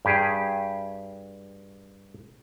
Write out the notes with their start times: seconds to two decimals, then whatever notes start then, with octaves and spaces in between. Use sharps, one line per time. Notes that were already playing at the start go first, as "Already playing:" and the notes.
0.05 G2 G4 G#4